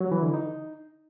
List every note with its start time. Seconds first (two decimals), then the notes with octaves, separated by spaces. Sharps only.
0.01 F#3
0.12 E3
0.23 D3
0.34 D#4